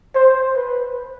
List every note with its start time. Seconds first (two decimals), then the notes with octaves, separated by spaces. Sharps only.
0.15 C5
0.56 B4